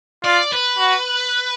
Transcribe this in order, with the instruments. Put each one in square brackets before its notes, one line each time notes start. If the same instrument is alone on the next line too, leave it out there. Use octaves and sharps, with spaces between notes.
[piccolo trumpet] F4 [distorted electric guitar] D5
[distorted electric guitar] B4
[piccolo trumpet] F#4